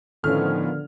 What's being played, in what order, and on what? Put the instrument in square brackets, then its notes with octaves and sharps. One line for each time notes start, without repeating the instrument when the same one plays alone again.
[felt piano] A2 [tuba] D3 [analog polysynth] D#3 F3 B3 [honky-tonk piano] C#4 F6